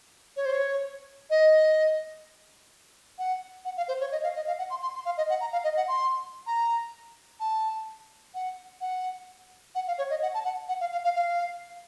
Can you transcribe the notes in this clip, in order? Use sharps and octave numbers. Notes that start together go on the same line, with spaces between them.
C#5
C5
C#5
D#5
F#5
F#5
F5
C5
C#5
D#5
F5
D#5
F5
F#5
C6
C6
C6
F5
D#5
F#5
A#5
F5
D#5
F#5
C6
A#5
A5
F#5
F#5
F#5
F5
C#5
D#5
F#5
A5
F#5
F#5
F5
F5
F5
F5